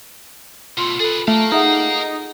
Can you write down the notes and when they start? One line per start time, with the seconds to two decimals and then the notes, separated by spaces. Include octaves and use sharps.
0.77 B2 A3 F4 C6
1.00 G#4 A4 B4
1.28 A3 A#4 F5
1.52 D#4 G#4 E5 F#5